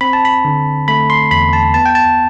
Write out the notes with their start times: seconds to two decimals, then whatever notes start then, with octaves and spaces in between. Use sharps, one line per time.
0.01 C4 B5
0.13 A5
0.25 B5
0.45 D3
0.88 A3 B5
1.10 C6
1.31 E2 B5
1.53 A5
1.74 B3 A5
1.86 G5
1.95 A5